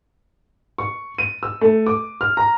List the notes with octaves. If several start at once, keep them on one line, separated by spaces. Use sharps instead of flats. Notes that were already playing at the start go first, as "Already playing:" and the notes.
C#6
D#7
E6
A3
D6
F6
A#5